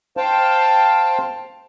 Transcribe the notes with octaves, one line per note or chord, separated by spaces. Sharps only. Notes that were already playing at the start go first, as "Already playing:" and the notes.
C5 F5 G5 A5